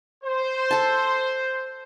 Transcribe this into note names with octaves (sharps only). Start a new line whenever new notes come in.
C5
A4 A5